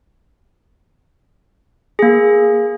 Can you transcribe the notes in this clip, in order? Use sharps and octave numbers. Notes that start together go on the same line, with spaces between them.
A#3 G#4